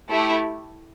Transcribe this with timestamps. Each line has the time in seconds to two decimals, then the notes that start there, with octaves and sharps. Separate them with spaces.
0.10 A3 E4 G4